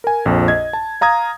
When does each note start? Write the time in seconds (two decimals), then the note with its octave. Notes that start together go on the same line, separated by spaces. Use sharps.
0.04 A#4 G#5
0.25 A#1 F2
0.48 D#5 G#6
0.73 A5
1.01 F5 A#5 D#6 G#6